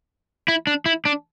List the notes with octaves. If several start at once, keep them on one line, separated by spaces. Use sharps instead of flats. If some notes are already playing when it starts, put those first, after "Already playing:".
E4
D4
E4
D4